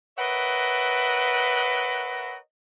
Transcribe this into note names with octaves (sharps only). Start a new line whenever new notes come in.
A#4 B4 C#5 D#5 E5 F#5